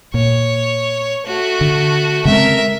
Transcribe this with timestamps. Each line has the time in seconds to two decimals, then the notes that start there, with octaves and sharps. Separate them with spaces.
0.14 A#2 C#5
1.26 A3 F#4
1.61 D3
2.25 C#3 G#3 C4 A#4 E5